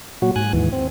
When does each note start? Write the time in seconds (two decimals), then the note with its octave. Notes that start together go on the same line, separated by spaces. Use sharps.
0.22 A#2 F#3 F#4
0.36 G#2 G#5 F#6
0.53 D#2 G#2 E3
0.73 C4